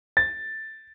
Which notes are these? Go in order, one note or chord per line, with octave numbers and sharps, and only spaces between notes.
A6